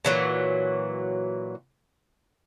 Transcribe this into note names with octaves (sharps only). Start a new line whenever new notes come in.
A#2 E3 F#3